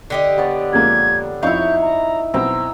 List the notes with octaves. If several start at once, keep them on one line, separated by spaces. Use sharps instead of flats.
D3 G4 D#5
B3 C#5 D5
F2 G#3 A#3 G#6
F2 D#4 E4 C#5 F5 G6
A#5
B1 C4 A#5 E6